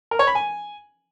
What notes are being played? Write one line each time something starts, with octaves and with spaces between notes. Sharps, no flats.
A#4
C#5
B5
G#5